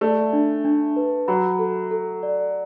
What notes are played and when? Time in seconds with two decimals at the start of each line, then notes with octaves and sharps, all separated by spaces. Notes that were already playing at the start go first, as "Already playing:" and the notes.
0.01 A3 D5
0.33 D4
0.64 D4
0.96 B4
1.28 F#3 B5
1.59 A4
1.91 A4
2.23 D5